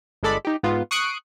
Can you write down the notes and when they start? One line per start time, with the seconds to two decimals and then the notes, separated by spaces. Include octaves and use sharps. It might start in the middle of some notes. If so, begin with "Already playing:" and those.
0.23 G1 G#3 A4 D5 B5
0.45 D#4 G4
0.63 G#2 B3 F4
0.91 C#6 D#6 F#6 C7 D7